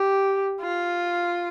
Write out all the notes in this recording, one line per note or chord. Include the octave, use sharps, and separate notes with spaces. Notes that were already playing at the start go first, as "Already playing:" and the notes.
Already playing: G4
F4